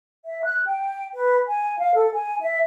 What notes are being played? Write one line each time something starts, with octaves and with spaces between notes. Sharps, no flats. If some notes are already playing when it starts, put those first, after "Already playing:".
E5
F#6
G5
B4
G#5
F5
A4
G#5
E5